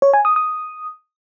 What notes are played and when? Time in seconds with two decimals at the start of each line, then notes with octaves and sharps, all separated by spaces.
0.02 C#5
0.13 G#5
0.25 D#6
0.36 D#6